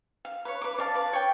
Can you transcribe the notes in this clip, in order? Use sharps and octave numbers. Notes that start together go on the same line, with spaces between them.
F5
B4 C#5
B4 D6
D5 F5 A5
B4
C#5 G5